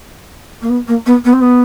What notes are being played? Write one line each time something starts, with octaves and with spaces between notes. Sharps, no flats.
A#3
B3
A#3
B3
B3
C4
B3